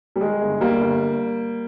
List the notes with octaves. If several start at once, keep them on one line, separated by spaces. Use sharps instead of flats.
G3
D#3 G#3
G1
G1 G3 A#3
G1